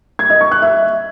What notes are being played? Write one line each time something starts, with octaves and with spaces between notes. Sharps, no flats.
G#6
D#5
C#6
F#6
E5